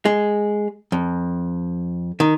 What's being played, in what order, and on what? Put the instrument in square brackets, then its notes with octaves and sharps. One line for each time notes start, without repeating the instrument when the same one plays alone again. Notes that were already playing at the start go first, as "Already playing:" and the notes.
[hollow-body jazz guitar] G#3
F2
D#3